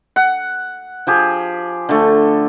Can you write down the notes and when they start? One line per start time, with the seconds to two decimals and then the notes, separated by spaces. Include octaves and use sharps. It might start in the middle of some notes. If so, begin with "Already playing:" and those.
0.16 F#5
1.07 F3 G4 G#4
1.89 D3 A3